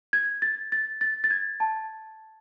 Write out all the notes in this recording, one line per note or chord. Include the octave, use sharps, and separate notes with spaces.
G#6
A6
A6
A6
A6
G#6
A5